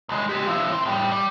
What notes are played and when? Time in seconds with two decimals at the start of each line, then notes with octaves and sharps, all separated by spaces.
0.09 C2 G#3
0.29 G#3 G4
0.47 F3 E4
0.73 C4
0.85 A2 G3
1.12 G3